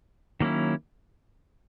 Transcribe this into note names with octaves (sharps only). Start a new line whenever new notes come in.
D#3 F#3 A#3 C#4 E4